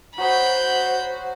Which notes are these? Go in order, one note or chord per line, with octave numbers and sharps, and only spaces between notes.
F#3 F#4 C5 B5 D#6 G6